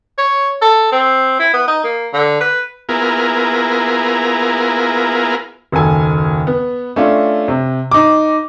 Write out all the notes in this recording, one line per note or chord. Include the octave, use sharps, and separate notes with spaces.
C#5
A4
C4
E4
B3
D#4
A#3
D3
B4
A#3 B3 E4 F4 G#4 A#4
F#1 D#2 A4 G#5
B3
A3 C#4 D4 F4
C3
D#4 D6